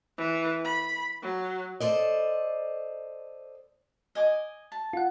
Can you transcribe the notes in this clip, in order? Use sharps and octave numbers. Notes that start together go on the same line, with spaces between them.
E3
B5
F#3
A4 C5 D5 D#5
D#5 G#5 D6
A5
F4 F#5